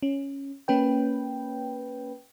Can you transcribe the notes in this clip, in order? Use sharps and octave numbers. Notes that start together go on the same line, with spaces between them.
C#4
A#3 C#4 B4 G5